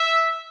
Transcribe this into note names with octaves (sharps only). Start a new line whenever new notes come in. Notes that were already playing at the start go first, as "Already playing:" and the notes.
Already playing: E5